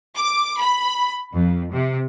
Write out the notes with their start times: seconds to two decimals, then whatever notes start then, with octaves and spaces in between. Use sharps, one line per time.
0.15 D6
0.58 B5
1.33 F2
1.72 C3